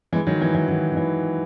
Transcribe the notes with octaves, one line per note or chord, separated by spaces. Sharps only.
E3 G#3
D#3 F#3
E3
E3
D#3 F#3
D#3
E3